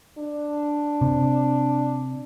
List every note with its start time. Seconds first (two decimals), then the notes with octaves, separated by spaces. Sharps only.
0.18 D4
1.01 C3